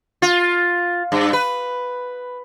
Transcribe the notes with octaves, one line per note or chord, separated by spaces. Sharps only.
F4
G2
B4